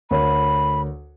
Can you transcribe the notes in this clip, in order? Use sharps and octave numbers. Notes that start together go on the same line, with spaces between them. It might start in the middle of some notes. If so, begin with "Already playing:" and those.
D2 A#4 C#5 B5